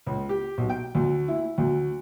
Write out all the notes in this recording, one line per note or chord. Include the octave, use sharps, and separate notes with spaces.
C#2
G4
B1
G5
D2
E4
D2